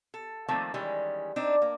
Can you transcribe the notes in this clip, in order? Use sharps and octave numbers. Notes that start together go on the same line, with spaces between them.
A4
D#3 F3 A3 A#3 C4
D#3 E3 G3 G#3 C#4
C4 D4 D#4
A#3